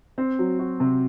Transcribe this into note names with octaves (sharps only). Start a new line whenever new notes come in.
C4
F#3
F#4
C3